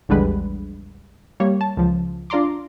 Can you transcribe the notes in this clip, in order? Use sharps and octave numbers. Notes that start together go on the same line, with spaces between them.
A#1 E2 D3 G3 G#3 B4
G3 A#3 C#5
A5
C#2 F3
D4 F4 D5 A#5 C6 D6